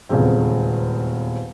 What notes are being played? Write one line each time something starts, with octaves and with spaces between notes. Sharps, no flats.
D#1 E2 C#3 G#3 C4